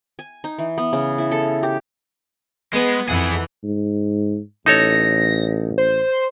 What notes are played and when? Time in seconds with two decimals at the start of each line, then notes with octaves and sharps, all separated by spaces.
0.19 G#5
0.44 D#4
0.58 E3
0.78 B3
0.93 C#3
1.18 E4
1.31 A4
1.63 G4
2.73 G#3 B3 B4 D#6
3.09 F2 E3 B3 G#4 F#5
3.64 G#2
4.66 A1 D#4 A4 C#5 A#6
5.78 C5